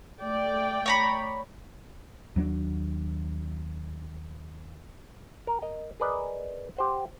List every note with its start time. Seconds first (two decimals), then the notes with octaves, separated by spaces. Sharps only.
0.22 A3 D5 G5
0.86 C#5 A#5 B5
2.36 D#2 F#3 B3 D4
5.47 A#4
5.62 A#4 D#5 A#5
6.00 G#4 A#4 B4 D5 D#5
6.77 G4 C5 F#5